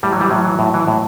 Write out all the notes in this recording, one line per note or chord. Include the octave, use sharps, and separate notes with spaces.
A2 G3
F#3
E3 G3
A2 F#3
E3
A2
E3
A2